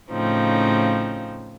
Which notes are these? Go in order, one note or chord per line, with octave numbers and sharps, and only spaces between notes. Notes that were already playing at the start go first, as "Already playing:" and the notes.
A2 C#3 F3 C4 D#4